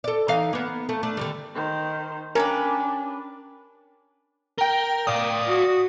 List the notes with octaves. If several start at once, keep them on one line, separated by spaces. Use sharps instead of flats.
A4 D5
E3 D#4 F5
A#3 B3
A3
A3 D4
D3 D#3 G3
D#3 C5
C#4 D4 G4 A#4 B4
A#4 G5 G7
D5 F5 D#6
F#4